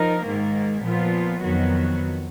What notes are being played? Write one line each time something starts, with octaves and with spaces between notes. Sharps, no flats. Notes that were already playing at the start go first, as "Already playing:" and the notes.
Already playing: F3 D#4 A#4
G#2 D#3 A#3
A#2 F3 B3 F4
F2 D#3 F#3 B3 F#4